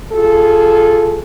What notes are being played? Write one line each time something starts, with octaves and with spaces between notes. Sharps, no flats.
F4 G#4 A4